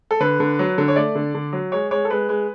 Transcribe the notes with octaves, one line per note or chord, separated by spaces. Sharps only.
A4
D3 B4
D3
F#3
D3
C#5
A3 D5
D3
D3
F#3
G#3 C#5
G#3 C#5
A4
G#3 B4
G#3